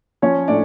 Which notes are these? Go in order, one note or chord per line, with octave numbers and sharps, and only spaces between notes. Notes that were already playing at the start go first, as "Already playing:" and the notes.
F3 C#4 C#5
A2 D4 D5